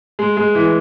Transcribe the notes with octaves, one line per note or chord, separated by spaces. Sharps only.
G#3
G#3
E3